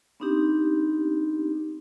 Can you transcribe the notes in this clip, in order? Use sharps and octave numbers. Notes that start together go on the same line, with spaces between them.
B3 C4 D4 D#4 G4